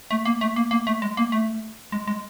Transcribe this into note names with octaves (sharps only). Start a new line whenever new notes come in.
A3
A#3
A3
A#3
A#3
A3
G#3
A#3
A3
G#3
G#3